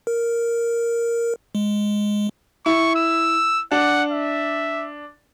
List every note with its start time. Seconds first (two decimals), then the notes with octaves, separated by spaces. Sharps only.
0.07 A#4
1.55 G#3
2.66 E4 C#6
2.96 E6
3.71 D4 F#5
4.11 E5